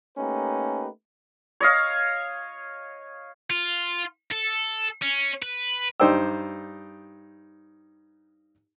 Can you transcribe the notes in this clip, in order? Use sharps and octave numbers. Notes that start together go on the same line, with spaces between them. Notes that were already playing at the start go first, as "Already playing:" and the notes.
A3 A#3 C#4 D#4 G4 B4
C#5 D#5 F5
F4
A4
C#4
B4
G2 D#4 C5 D5 G5 E6